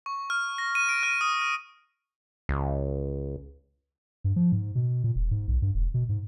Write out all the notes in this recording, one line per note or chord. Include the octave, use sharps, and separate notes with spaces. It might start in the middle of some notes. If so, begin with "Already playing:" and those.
C#6
F6
A#6
D#7
D7
F6
D#6
F6
C#2
G2
F3
G#2
B2
A#2
E1
G#2
B1
G2
E1
B2
G#2